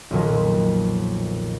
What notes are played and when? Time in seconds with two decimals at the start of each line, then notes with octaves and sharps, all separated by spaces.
0.11 B1 F2 A#2 D#3